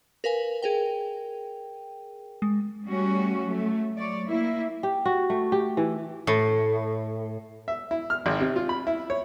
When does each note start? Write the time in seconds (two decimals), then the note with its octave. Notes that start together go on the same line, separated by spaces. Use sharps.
0.24 A#4 B4 F5 G#5
0.62 G#4 A#4 G5
2.42 G#3
2.85 G3 A3 C#4 F#4
3.44 F#3 A3
3.97 F#3 C#5 D5
4.26 A#3 E4
4.83 G4
5.05 F#4
5.30 A3
5.52 G4
5.77 E3
6.27 A2
7.68 E5
7.91 E4
8.10 F6
8.26 G#1
8.40 C3
8.56 F4
8.69 B5
8.87 E4
9.10 C#5